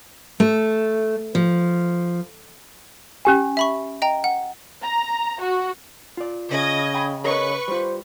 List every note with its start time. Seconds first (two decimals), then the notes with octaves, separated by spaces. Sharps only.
0.40 A3
1.35 F3
3.25 C#4 G4 G#5
3.57 E5 B5 C#6
4.02 D#5 G5 A#5
4.24 F#5
4.82 A#5
5.41 F#4
6.17 F4 D5
6.50 C#3 D#5 G#6
6.94 G5 B5 C6
7.24 G#4 A#4 B4 C#5 D#5 C#6
7.68 G3 F4 C5